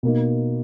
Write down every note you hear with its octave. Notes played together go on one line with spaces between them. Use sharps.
B2 A#3 D#4